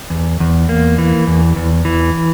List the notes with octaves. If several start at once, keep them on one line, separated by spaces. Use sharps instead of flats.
E2
E2
A#3
E3
E2
E2
E3